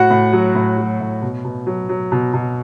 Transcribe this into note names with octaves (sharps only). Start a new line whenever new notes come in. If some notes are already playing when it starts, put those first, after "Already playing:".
Already playing: A2 F#4 F#5
A2
F#3
A2
F#3
A2
B2
B2
F#3
F#3
B2
B2